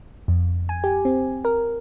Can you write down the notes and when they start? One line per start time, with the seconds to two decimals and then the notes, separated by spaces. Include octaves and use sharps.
0.28 F2
0.69 G#5
0.84 G4
1.05 C4
1.45 A#4